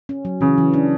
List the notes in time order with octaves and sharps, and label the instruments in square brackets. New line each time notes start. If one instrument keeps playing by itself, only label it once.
[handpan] C#4
F#3
[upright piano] C#3 [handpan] E3
[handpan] E3
D4